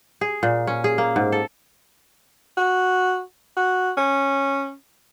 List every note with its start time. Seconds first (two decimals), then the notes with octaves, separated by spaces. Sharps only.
0.21 G#4
0.43 A#2
0.67 C#4
0.84 G#4
0.98 A#3
1.16 G#2
1.32 A4
2.57 F#4
3.56 F#4
3.97 C#4